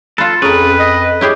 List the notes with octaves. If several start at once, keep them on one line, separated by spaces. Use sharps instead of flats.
F4 A4 B4
F2 C#4 G#4 A#4 B4
D#5
E4 G4 G#4 C#5